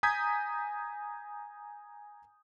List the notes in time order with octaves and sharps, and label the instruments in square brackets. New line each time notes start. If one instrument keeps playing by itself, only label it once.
[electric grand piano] G#5 A#5 D#6 G6 G#6 B6